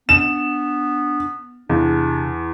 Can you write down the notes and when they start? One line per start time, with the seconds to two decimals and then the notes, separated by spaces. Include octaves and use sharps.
0.09 B3 D4 E7
1.69 E2 C3 D4